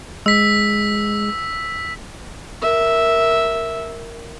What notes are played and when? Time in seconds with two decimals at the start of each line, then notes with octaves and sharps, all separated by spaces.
0.26 G#3 E6 B6
2.62 A#4 E5